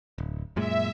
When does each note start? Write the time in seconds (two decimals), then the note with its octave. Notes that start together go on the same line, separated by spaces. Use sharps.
0.18 D1
0.56 F#2 A#2 G#3 E5